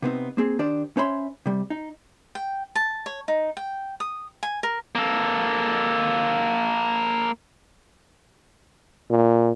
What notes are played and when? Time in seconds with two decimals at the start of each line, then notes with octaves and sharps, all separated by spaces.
0.02 C3 B3 C4 D#4
0.37 A#3 C4 G#4
0.59 D#3 D4 G4 C5 D5
0.97 C#4 C5 C#5 E5 B5 C6
1.46 C3 G3
1.70 D#4
2.35 G5
2.75 A5
3.06 C#5
3.28 D#4
3.57 G5
4.00 D#6
4.43 G#5
4.63 A#4
4.95 A#3 A4
9.10 A#2